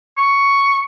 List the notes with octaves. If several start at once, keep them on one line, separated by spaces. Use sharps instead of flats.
C#6